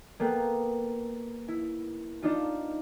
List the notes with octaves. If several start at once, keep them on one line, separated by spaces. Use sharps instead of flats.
A#3 B3 A4 F#5 G5
E4
D4 D#4 F4